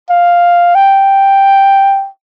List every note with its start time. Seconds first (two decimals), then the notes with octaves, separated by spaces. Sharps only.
0.10 F5
0.75 G5